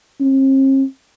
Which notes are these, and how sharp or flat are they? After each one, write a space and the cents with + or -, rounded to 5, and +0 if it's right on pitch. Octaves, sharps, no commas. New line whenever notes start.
C4 +45